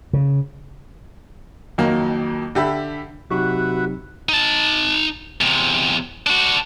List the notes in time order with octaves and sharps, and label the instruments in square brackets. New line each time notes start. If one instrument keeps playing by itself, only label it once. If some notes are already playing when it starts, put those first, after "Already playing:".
[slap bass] C#3
[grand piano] F2 D#3 F#3 A#3
D3 G4 E5 B5
[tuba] C3 [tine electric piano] F#3 D#4 G4 [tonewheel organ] F#4 [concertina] B4 E5 F#5
[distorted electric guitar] D#4 A5
E2 C3
D4 F#4